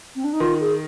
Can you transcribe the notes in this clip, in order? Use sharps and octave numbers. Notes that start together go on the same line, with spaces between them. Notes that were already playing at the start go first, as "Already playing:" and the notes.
C4
D4
D#4
D#3 F4
G#4